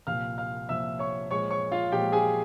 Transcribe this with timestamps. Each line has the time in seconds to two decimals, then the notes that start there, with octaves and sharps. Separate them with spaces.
0.07 C2 A#2 F3 F5 F6
0.38 F5 F6
0.69 C2 A#2 F3 E5 E6
0.99 C#5 C#6
1.31 A#2 F3 G#3 C#5 C#6
1.51 C#5 C#6
1.72 F4 F5
1.92 A#2 F3 G#3 G4 G5
2.12 G#4 G#5